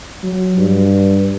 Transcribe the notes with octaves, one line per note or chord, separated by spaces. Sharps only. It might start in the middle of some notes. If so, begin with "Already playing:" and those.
F#3
G2